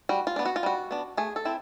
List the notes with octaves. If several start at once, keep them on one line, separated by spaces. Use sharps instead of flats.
G3 F#4
F4
B3 D4
F#4
F4
G3 F#4
B3 D4
A3 G#4
A4
C4 E4